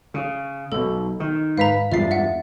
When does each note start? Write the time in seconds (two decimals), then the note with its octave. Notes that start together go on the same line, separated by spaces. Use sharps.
0.14 C#3
0.72 B1 B2 A4
1.20 D#3
1.57 G#2 B4 F5 A#5 B6
1.92 E2 G2 G#3 F4 E5 A6 C7
2.11 E5 F#5